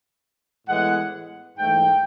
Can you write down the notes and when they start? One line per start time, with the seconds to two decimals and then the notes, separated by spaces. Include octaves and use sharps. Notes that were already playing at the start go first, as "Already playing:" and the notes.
0.68 A2 E3 G#3 B3 F#5
1.58 G#2 E3 A3 G5